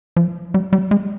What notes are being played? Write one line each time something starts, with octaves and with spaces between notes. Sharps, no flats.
F3
G3
G3
G#3